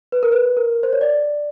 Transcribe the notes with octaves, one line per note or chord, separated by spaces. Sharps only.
B4
A#4
B4
A#4
C5
C#5
D5